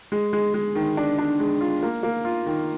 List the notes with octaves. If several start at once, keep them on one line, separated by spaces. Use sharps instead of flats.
G#3
G#3
G#3
D#3
D4
D4
G#3
F4
A#3
A#3
F4
D#3